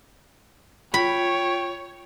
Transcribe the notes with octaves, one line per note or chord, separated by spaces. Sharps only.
F4 C#5 G5 B5